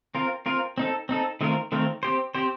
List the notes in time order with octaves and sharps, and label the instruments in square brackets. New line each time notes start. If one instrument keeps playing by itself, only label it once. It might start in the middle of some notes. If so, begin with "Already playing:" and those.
[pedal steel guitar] C4 F4 A#4
C4 F4 A#4
C4 D#4 A4
C4 D#4 A4
D#3 A3 C4 F4 A#4
D#3 A3 C4 F4 A#4
C4 G4 C5
C4 G4 C5